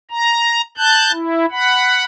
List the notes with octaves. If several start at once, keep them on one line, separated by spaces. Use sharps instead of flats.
A#5
A5 F#6 G6
E4
F#5 B5